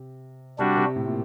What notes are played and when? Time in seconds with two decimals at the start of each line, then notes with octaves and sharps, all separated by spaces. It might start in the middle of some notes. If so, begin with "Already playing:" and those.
Already playing: C3
0.59 C3 G3 D4 F#4
0.77 C3
0.96 A2
1.07 A#2